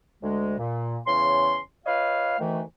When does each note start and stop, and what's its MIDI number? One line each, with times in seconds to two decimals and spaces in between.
0.23 0.58 38
0.23 0.58 56
0.59 0.98 46
1.07 1.59 40
1.07 1.59 49
1.07 1.59 61
1.07 1.59 73
1.07 1.59 84
1.86 2.36 65
1.86 2.36 71
1.86 2.36 73
1.86 2.36 75
1.86 2.36 77
2.39 2.62 38
2.39 2.62 51
2.39 2.62 52
2.39 2.62 57